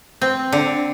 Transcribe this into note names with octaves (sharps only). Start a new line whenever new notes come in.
C4
D3